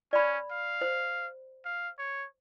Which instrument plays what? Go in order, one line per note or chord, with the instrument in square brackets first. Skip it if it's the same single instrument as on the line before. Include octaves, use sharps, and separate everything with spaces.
[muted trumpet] C#4 [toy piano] D5 B5
[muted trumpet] F5
[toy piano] C5
[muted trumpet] F5
C#5